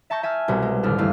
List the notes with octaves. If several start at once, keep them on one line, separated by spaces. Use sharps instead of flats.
E5 A5 C#6 G6 A#6
E5 G#5 A5 F6
C2 B2
G#3
D#2 A2 D3 D4 E4 F6
A1 E2 G2 A3 A#3 F5